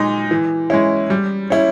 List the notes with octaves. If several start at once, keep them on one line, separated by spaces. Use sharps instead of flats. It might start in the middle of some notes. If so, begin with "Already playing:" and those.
Already playing: A#2 G#3 D#4
E3
G#3 C#4 E4
G3
C#4 E4